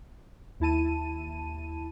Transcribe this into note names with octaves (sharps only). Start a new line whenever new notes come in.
D#2 E4 A5 D#7